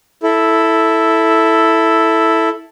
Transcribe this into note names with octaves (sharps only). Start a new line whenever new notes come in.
E4 A4